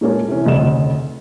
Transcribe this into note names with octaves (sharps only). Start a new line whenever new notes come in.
A#2 G#3 A#3 C#4 A4 A#4
C3 E3 C#4
F1 D2 C#3 D#5 E7